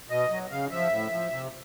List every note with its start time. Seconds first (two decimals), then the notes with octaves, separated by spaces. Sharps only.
0.10 B2 D#5
0.30 F#3
0.51 C#3 F5
0.71 F3 E5
0.92 A2
1.12 F3
1.32 C3